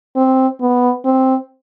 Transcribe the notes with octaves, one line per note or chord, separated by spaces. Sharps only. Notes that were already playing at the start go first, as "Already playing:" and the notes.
C4
B3
C4